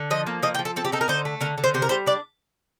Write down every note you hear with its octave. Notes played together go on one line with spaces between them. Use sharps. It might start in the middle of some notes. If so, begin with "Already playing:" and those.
Already playing: D3
F3 D#5
A#3
F3 D#5
G5
F3
A4
C4 A4
G4
D#4 A4
A#4
D3 C5
A3
D3 A#4
D3
C5
C3 C5
A#4
G3 C5
D4 D5